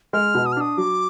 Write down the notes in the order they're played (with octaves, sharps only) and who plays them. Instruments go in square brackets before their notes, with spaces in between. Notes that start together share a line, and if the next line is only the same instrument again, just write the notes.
[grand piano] G#3 [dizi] F6
[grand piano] B2
[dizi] D#6
F6
[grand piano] D4 [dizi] D#6
[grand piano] F#3 [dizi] D6